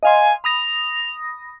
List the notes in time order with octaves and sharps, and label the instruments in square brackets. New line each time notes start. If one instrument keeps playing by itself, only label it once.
[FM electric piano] D#5 F5 C6 [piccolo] G#5
[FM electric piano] B5 D#6 A#6 [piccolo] F7